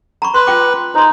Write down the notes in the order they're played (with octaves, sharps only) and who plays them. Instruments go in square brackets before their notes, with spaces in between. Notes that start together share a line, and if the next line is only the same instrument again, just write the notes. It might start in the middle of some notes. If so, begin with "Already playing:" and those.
[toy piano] A#5 B5 C#6
[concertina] B4 [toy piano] C6
[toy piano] F4 G5 D6
[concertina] D#4 [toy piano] C5 C6